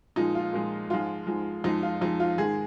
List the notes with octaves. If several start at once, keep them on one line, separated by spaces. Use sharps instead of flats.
A#2 F3 G#3 D#4
F4
A#2 F3 G#3
G#2 F3 G#3 F4
G#2 F3 G#3
F2 F3 G#3 D#4
F4
F2 F3 G#3 D#4
F4
G#2 D#3 G#3 G#4